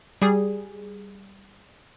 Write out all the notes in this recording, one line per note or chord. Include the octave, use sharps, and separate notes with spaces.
G3 G#4